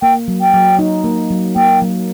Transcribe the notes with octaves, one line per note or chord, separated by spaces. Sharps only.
A#3 G5
F#3
G5
F#3
D#4
A#3
F#3
A#3 G5
F#3